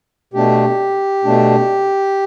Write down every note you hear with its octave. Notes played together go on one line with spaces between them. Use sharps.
B2 A3 D4 G4
B2 A3 D4